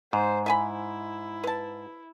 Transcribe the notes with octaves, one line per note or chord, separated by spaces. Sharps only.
G#2 C5
E4 E5 G#5 B5
B4 A5